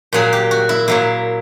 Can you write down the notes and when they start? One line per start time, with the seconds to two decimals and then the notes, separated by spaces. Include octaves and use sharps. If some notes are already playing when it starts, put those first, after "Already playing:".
0.13 A#2 F#3 A#3 G#4
0.33 G4
0.51 F#4
0.69 E4
0.88 A#2 F#3 A#3 E4